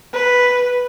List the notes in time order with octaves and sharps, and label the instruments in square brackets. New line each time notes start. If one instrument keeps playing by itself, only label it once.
[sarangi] B4